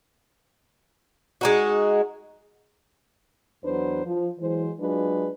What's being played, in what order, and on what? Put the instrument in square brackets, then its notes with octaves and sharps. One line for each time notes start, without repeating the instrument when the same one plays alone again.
[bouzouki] G#3 D#4 F#4
[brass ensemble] E2 F#3 D4 B4 C5
F3
E3 F#3 G#3 C5
F#3 G#3 D4 F4 B4